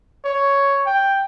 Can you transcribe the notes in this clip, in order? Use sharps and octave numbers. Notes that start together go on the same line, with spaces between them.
C#5
G5